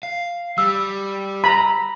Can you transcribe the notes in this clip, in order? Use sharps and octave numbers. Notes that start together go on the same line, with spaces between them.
F5
G3 E6
A#5 B5